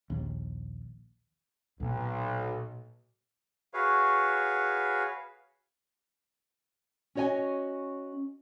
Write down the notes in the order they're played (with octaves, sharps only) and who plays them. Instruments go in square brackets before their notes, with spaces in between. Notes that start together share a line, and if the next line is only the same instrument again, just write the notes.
[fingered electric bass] A#1 D#2
[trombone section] B1 [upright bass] A#2
[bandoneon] F#4 G#4 B4 C#5 F5
[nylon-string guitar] C#4 F#4 C#5 D#5 G#5